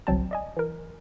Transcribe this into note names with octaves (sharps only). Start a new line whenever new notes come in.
G1 C2 F#3 C4 G5 A5
D5 D#5 G#5
E3 A#4